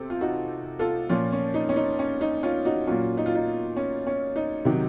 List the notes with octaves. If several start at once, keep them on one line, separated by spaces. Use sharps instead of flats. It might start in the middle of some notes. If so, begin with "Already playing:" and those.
Already playing: C3 A4 C5
F4
D#4 F#4
F4 A4
A#2 F3 C#4 F4
C#4
D#4
C#4
D#4
C#4
D#4
C#4 F4
D#4 F#4
A#2 F#3 C#4 F4
D#4
F4
D#4
C#4
C#4
D#4
C3 D#3 F#3